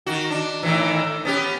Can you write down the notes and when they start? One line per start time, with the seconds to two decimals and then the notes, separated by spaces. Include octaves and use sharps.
0.06 D#3 F#4
0.30 D4
0.63 A2 D#3 E3
1.25 B3 C#4 G4